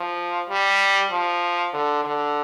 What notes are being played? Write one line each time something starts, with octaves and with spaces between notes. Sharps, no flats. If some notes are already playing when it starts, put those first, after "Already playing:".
Already playing: F3
G3
F3
D3
D3